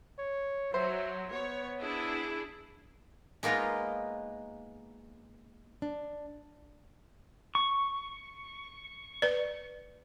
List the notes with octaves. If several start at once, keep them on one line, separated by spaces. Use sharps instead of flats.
C#5
F#3 C5 E5
B3 C#5
D4 E4 G#4
G#3 A#3 B3 D#4 F4
D4
C#6
B4 D5